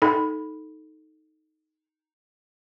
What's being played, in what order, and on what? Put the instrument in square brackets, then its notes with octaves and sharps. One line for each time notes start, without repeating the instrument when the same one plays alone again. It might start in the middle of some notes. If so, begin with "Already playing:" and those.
[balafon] D#4 A4 B5